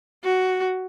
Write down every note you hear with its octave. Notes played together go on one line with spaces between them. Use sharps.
F#4